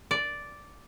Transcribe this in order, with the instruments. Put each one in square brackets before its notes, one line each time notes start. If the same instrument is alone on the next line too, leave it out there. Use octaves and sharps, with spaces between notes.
[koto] D5